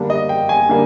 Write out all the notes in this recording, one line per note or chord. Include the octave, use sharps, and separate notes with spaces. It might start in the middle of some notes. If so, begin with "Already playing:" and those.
Already playing: D3 G3 A#3 D4
D#5
G5
G#5
D3 G3 A#3